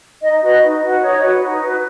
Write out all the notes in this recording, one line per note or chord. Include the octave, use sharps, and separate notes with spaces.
D#4 D#5
F#4 B4 D#5
D#4
F#4 B4
D#4 C#5
F#4 B4
D#4
F#4 B4